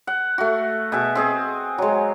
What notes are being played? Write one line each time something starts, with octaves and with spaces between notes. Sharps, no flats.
F#5
A3 F#4
B2 G#4 E5
C4 G#4 D#5
F#3 G#3